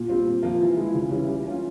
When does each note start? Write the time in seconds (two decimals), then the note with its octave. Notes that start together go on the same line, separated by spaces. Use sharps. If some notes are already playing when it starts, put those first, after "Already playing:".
Already playing: A#2
0.08 G3 C4 F4
0.26 A#2
0.43 F3 A#3 F4
0.60 E3
0.77 G#3 E4
0.94 C#3
1.11 E3 G3 C#4
1.28 G3
1.45 A#3 C#4 F4